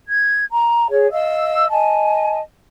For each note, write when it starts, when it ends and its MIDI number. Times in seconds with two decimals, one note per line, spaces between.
0.07 0.42 92
0.50 0.86 82
0.89 1.09 68
0.89 1.09 73
1.11 1.64 75
1.11 1.64 77
1.11 1.64 88
1.69 2.39 75
1.69 2.39 80
1.69 2.39 81